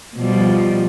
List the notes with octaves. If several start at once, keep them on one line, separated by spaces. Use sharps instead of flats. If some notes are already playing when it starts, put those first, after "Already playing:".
B2 F3 G3